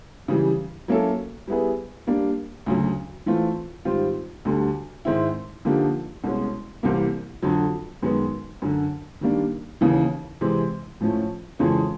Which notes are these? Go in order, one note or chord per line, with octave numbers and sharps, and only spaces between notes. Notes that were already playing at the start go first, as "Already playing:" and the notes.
C#3 E3 G3
F#3 A#3 C#4 E4 A4
G3 B3 E4 G#4 B4
G3 A#3 D4
D2 C#3 F#3
E3 A3 C4 F4
G#2 D#3 G3 C4 F4
D2 D3 G3
G#2 D#3 G#3 C4 E4
D3 F3 A#3 D#4 G4
C2 B2 G#3 C#4
C2 C3 E3 G3 A#3
F2 D3 F#3
F#2 D#3 G#3 B3
F#2 D3 F#3
D#3 G3 A#3 D4
D#2 C#3 E3
C3 E3 G#3 C4
A2 F3 A3 C#4
F2 C#3 E3 G#3 C#4